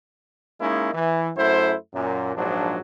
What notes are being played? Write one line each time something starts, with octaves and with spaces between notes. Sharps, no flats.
G#3 A#3 C#4 D#4 E4
E3
F#2 A3 E4 C5
F#2 A#2
A#1 G#2 F3 F#3 D4